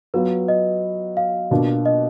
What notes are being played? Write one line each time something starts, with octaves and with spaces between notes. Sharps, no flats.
F#3 B3 F4 B4
D#5
F5
B2 A#3 D4 F4
D#5